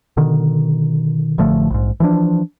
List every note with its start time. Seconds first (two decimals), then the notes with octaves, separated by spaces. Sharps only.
0.17 B2 D3 D#3
1.38 A1 D3 F3 A3
1.70 A#1 G#2
2.00 E3 F3 D4